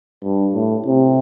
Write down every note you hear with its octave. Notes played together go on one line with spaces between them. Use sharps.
G2
A2
C3